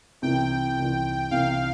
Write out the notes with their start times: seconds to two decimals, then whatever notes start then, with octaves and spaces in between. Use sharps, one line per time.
0.22 C2 C3 E3 G5
0.77 C2 C3 E3
1.31 C2 C3 E3 F5